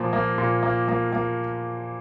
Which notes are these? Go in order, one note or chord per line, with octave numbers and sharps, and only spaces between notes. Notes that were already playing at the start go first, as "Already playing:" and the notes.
Already playing: A#2 F3 A#3
A#3
A#2
A#3
A#3
A#3